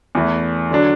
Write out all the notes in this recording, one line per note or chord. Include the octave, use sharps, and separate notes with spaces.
E2 E3 A3
D3 F#3 D4